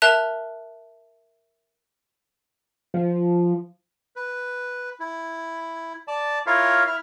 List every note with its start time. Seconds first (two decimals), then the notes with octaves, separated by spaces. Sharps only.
0.02 A#4 E5 A5 F#6 E7 F7
2.94 F3
4.16 B4
5.00 E4
6.08 D5 A5
6.47 E4 F4 A#4 C#5 E5 F5
6.87 E4 E5 F6